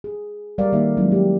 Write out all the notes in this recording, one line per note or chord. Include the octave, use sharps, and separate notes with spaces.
G#4
G3 A#4 D5 F5
D#3 A3 A#3 D#4 E5
F#3 G#3 C#4 E4
F#3 G4